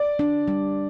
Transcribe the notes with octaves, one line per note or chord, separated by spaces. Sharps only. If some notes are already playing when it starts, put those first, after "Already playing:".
Already playing: D5
D4
G3